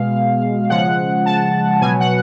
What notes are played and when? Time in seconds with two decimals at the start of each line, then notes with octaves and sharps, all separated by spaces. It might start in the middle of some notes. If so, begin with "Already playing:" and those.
Already playing: B2 G#3 F5
0.69 C#3 F3 G#3 F#5
1.26 A5
1.81 B2 F#3 G#5
2.00 F#5